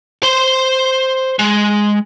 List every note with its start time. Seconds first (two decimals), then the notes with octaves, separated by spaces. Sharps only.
0.23 C5 C6
1.39 G#3